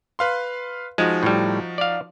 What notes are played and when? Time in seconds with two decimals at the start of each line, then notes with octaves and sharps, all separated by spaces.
0.19 B4 F5 C6
0.98 F3 G#3 D#4 F#4
1.23 A2 G3
1.78 D5 F5